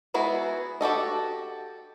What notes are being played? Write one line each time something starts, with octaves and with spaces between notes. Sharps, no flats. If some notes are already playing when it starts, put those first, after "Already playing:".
G#3 B3 E4 F#4 G#4
F#4 G4 A4 D#5